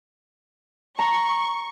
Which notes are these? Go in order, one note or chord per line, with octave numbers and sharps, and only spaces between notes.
A#5 C#6